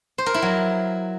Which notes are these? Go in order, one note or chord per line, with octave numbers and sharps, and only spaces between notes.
C5
A#4
E4
F#3